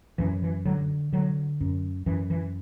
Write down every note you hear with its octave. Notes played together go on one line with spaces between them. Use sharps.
F#2 E3
E3
D3 F#3
D3 F#3
F#2
F#2 E3
E3